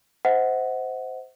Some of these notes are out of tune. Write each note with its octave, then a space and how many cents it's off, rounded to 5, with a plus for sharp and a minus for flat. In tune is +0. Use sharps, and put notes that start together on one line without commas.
C5 -15 D#5 +45 F#5 +0